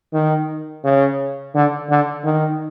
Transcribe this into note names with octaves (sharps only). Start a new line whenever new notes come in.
D#3
C#3
D3
D3
D#3